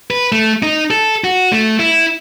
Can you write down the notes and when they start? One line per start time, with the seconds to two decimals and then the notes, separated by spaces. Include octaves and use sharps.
0.11 B4
0.32 A3
0.63 D#4
0.91 A4
1.24 F#4
1.52 A3
1.79 E4